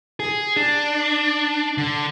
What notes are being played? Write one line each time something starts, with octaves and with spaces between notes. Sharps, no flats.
G#4
D4
D3